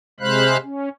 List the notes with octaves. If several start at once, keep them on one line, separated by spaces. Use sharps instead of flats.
C3 G#3 C5 F5 B5 F#6
C#4